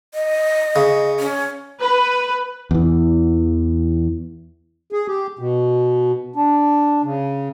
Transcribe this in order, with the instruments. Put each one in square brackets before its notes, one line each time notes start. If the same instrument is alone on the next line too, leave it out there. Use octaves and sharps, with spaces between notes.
[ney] D#5
[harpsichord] C#3
[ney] C#4
[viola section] B4
[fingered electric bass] E2 E3
[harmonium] G#4
G4
B2
D4
C#3